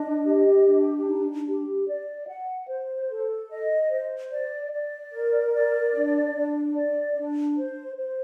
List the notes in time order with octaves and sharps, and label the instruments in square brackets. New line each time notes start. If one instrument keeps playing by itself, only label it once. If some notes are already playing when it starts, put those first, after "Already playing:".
Already playing: [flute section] D4 D#5
G4
D4
D#4
G4
D5
F#5
C5
A4
D#5
C5
D5
D5
A#4
D5
D4
D4
D5
D4
C5
C5